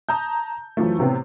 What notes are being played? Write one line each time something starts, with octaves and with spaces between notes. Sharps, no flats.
A5 A#5 D#6 G6
F#2 E3 F3 A3
A2 C3 B3 C4